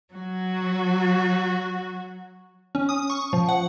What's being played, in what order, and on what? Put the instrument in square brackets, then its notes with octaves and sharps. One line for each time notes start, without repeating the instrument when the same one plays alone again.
[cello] F#3 F#4
[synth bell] C#4
D#6
C#6
F3
F#5